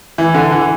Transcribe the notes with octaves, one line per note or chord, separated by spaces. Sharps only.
E3
D3
E3